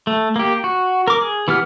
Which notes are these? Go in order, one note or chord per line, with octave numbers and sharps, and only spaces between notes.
A3
A#3 G4
F#4
A#4 D6
G#4
E3 B3 G4 F6